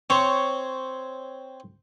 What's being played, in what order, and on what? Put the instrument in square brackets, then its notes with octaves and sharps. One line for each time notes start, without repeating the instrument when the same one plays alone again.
[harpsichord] C4 C5 [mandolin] C#5